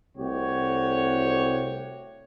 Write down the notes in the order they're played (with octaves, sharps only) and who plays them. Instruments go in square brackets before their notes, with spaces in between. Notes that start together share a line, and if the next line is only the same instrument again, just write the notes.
[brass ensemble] C2 A3 F#4 G4 C#5